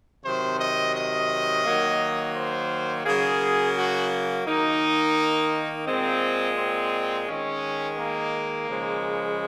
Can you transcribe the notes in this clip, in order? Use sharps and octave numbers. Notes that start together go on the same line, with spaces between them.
C3 D#3 F#3 C5
D#5
D#5
D#3 F#3 A#3
C5
C#3 F#3 A#3 G#4
F#4
D#3 A#3 D#4
A#2 G#3 C4
C4
D#3 G#3 C#4
A#3
C#3 F3 G#3